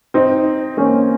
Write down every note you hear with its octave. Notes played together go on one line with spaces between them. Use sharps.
C4 D#4
A#3 C#4